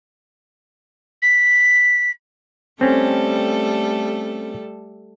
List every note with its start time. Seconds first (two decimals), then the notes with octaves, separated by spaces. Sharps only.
1.22 B6
2.81 G3 A3 C4 C#4 A4